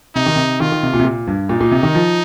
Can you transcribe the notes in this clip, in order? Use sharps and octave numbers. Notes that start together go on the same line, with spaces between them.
C3 D#4
D#3
C3
D#3 F4
D#3
C3
A#2
C3
A#2
G2
A#2 D#4
A#2
C3
D#3
F3